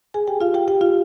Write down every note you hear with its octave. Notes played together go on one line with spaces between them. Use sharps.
G#4 G#5
G4 G5
F4 F5
G4 G5
G4 G5
F4 F5